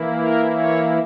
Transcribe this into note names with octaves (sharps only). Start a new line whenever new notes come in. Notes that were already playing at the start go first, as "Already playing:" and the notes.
Already playing: E3 A#3 E4
A#4
C#5